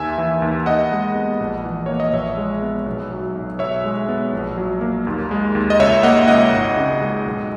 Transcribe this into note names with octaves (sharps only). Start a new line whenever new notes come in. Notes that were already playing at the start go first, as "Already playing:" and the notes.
Already playing: D#2 A#3 E5 G#5
E3
D#2
D#2 D#5 F#5
G#3
B3
A#1
E3
A#3 C#5
D#5
A#1 C#5 E5
G#3
B3
B1
F#3
B1
B1 C#5 E5
G#3
B3
A#1
F#3
A#3
D#2
G#3
D#2
D#5
C#2 C#5 E5
A#3 D#5 F#5
C#2 D#5 F#5
G#1
C#3
G#3
B1